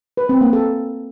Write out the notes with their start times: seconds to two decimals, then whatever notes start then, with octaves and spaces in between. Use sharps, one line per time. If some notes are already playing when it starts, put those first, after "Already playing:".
0.17 B4
0.29 C4
0.41 A#3
0.53 A4